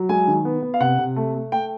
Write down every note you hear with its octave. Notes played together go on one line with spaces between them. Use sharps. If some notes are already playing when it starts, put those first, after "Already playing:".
Already playing: F#3
G#3 G#5
D#3
B3
B3
F5
C3 F#5
C3
A3
A3
A3 G5